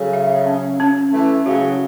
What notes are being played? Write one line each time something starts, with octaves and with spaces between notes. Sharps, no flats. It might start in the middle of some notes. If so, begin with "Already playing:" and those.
Already playing: C#3 F#3 A4
E5
C#4
C#4
E3 A3 C#4
C#3 F#3 F#4